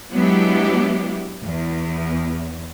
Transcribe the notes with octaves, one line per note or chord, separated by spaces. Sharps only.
F#3 G#3 B3 D4 E4 G4
E2